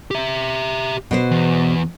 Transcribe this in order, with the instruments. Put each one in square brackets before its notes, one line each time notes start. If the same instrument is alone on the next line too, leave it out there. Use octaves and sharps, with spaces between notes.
[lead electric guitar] G4 E5
[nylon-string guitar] B2 B3 C5
[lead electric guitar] E2